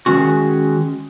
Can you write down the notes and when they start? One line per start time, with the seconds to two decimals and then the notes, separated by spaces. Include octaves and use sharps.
0.06 D#3 G#3 C#4 F#4